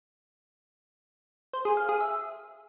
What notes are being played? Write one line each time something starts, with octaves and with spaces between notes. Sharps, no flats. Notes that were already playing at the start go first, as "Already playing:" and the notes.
C5
G#4
F5
G#4
E5